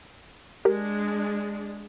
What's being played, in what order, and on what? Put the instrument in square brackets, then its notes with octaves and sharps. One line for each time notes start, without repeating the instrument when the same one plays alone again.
[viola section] G#3 D4 [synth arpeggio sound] G4 A#4